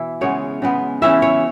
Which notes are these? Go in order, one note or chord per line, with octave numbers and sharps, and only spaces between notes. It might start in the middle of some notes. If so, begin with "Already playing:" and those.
Already playing: B2 E3 E4
C#3 G#3 B3 C#5
C#3 G#3 B3
C#3 E3 C#4 E4 E5
C#5